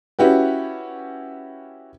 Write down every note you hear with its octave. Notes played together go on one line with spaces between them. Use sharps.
C#4 E4 F#4 G4 B4